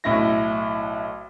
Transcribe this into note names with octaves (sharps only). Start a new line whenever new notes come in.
B1 A2 E4 A#6